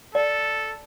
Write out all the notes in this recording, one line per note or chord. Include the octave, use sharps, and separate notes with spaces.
A4 D5